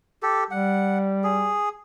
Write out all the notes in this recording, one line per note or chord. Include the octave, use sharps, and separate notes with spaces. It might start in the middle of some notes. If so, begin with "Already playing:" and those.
G4 A4
G3 F#5
G#4